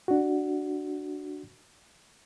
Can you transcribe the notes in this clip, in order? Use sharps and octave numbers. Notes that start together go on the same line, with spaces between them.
D4 F#4